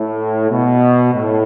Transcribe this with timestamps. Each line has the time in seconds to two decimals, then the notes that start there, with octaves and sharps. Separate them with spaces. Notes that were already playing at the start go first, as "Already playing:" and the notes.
Already playing: A2
0.50 B2
1.14 A2